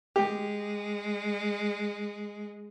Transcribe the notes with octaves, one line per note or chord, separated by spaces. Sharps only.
G#3 G4